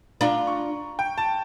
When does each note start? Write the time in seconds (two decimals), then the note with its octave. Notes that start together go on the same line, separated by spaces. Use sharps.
0.21 D4 F4 A#5
0.47 C#6
0.99 G5
1.18 A5